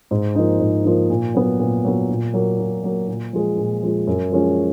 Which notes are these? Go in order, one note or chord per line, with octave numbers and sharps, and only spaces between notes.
G#2
F3 A#3 D#4
G#2
F3 A#3 D#4
A#2
F#3 B3
A#2
F#3 B3
A#2
F#3 A#3
A#2
F#3 A#3
A#2
F3 G#3
A#2
F3 G#3
F#2
F3 G#3 C#4